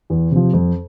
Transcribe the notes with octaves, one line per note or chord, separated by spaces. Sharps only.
E2
C3 F3
F2